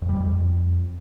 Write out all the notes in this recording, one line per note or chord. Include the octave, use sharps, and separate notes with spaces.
F2
G3
E2
F2